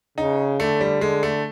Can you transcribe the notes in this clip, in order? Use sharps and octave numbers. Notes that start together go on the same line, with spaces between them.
C#3 D#4
D3 A3
G3
D3 G#3
A3